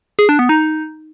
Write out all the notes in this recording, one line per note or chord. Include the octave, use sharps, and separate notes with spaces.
G#4
D4
B3
D#4